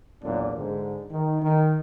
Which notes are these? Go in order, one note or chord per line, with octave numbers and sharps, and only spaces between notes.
B1 E2 A#2 F#3 D4
G#2 D3
D#3
D#3